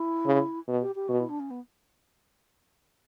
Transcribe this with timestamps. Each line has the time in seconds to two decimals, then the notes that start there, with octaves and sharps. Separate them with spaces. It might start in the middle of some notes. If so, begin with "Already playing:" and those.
Already playing: E4
0.26 C#3
0.67 B2
0.81 G4
0.95 G4
1.08 B2 F#4
1.20 E4
1.29 D4
1.40 C#4
1.51 B3